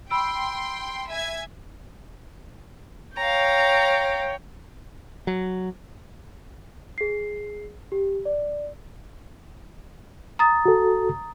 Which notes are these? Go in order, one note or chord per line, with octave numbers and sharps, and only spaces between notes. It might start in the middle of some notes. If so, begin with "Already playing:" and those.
G5 B5 C6 E6 D7
E5 G#5 G#6
C#5 F5 G5 A#5
F#3
G#4 C7
G4
D5
A#5 D#6 A6
F#4 A4